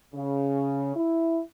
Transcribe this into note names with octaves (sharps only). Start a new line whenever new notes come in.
C#3
E4